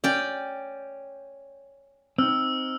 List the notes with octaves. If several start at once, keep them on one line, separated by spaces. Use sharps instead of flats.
C#4 D5 G5
C4 D#4 E6 F6